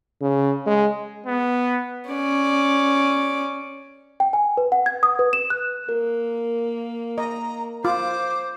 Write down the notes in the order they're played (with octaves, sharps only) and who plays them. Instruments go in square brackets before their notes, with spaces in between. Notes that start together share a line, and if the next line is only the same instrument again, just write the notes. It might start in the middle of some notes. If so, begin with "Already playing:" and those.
[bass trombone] C#3
G#3
[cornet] B3
[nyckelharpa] C#4 D5
[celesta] G5
G#5
B4
F#5
G#6
D#6
B4
E7
F#6
[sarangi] A#3 [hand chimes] A#4
[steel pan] D#5 [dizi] A#5
[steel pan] F4 [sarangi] C5 [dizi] D6